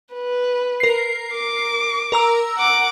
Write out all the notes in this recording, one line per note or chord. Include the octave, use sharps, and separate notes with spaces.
B4
A#4 C7
D6
A#4 A#5 E6
F#5 D6